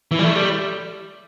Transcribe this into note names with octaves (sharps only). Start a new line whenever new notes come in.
E3
G3
A3
G3